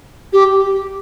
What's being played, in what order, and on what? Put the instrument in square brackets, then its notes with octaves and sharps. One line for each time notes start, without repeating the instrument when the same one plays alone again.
[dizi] G4